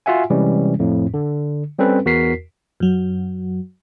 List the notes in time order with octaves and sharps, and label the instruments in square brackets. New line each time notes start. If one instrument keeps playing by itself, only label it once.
[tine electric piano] F4 F#4 E5 F#5 G#5
C3 E3 G3 G#3 C#4
F2 A2
D3
G3 C4 C#4 A4 B4
E2 F#4 A#4 B6 C7
[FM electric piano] F#2 F#3